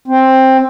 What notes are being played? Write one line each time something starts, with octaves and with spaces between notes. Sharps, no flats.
C4